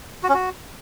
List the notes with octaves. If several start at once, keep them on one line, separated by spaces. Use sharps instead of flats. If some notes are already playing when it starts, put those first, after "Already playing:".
F#4
C#4
F#4